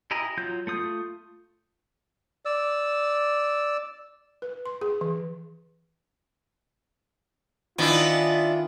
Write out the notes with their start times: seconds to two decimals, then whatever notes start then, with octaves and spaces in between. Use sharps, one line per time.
0.11 E4 G4 D#5 G#5 A#5
0.37 F#3 F4 G6
0.67 A3 F4 D#6 G6
2.45 D5 E6
4.42 B4
4.66 C6
4.81 G#4
5.01 E3
7.78 D#3 B3 D4 E4 F4 G#5